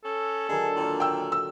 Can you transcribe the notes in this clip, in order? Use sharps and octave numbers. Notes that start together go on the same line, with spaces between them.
C#4 A4
D3 D#3 F#3 G#4
A#2
G5 E6
E6